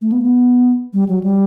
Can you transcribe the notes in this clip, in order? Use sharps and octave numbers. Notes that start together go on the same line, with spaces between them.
A3
B3
B3
G3
F#3
G3